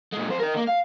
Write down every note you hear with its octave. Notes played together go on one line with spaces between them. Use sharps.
A#2 G#3
F2 C5
A#4 D#5
D3 A#3
F5